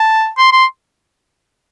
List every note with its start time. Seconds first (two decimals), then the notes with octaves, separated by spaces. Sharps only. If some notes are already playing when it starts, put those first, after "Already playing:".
Already playing: A5
0.38 C6
0.52 C6